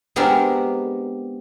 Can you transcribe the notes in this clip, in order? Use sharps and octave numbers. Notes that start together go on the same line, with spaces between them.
G#3 B3 C4 D4 G4 A#4